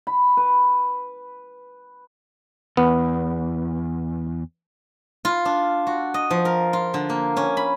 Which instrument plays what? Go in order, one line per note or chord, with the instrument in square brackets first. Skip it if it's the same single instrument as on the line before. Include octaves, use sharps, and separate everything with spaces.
[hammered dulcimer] B5
B4
[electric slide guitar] E2 [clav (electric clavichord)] B3
[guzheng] F4
D4
F#4
D#5
F3
A#4
F4
D3
A#3
C#4
B5